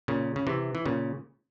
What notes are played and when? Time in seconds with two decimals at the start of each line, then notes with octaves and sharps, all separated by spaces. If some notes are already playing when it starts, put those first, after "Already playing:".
0.08 A#2 C#3
0.36 C#3
0.47 C3 E3
0.75 E3
0.86 A#2 C#3